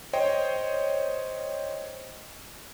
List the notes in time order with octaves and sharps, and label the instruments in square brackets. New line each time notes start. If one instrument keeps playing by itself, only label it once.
[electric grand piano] C5 C#5 D#5 G5